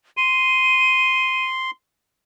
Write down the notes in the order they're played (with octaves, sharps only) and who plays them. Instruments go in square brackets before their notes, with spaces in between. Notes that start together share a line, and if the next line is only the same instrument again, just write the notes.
[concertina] C6 [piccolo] D#7